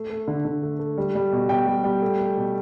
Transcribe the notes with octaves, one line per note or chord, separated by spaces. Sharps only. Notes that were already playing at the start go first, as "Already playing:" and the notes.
Already playing: A3
A3
D3
D3
A3
A3
G3
G3
B2
B2 G5
G3
G3
A3
A3
B2